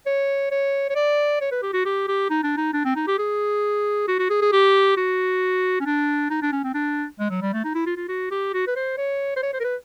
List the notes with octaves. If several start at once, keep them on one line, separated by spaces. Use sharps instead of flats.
C#5
C#5
C#5
D5
C#5
B4
G4
F#4
G4
G4
D#4
D4
D#4
D4
C4
D#4
G4
G#4
F#4
F#4
G#4
G#4
G4
F#4
C#4
D4
D#4
D4
C#4
C4
D4
G#3
F#3
G3
A3
D#4
E4
F4
F4
F#4
G4
F#4
B4
C5
C#5
C5
C#5
C5
A#4
B4